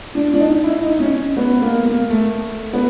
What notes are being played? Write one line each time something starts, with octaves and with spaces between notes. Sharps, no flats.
D4
D4
D#4
E4
D#4
C#4
B3
A#3
A#3
A3
B3